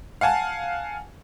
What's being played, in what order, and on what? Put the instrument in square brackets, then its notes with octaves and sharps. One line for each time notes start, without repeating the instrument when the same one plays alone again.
[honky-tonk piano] F5 F#5 G#5 A5